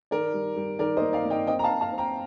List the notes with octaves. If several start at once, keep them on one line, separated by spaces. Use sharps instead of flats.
D#3 A#4 D5
G3
G3
D#3 A#4 D5
C5 D#5
A#3
D5 F5
A#3
D#5 G5
C4 D#5 G5
A#5
F5 A5
C4
F5 A5
C4
G5 A#5